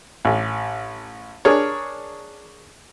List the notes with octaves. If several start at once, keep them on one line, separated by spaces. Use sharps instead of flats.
A1
D4 G#4 A#4 C#5